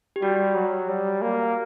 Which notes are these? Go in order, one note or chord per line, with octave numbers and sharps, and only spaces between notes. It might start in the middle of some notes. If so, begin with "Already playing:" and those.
G4
G3 F#4
F#3
G3
A#3